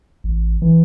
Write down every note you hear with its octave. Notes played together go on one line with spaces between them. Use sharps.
A1
E3